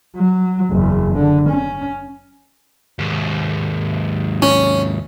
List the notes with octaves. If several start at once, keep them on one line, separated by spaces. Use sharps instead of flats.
F#3
F#1 E2
D3
C#4
D#2 G#2
C#4